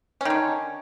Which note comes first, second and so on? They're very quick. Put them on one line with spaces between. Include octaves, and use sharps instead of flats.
C#4 D#3 D3